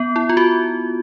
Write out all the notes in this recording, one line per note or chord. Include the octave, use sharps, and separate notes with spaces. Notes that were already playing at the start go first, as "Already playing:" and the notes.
Already playing: B3
E4
F4
F#4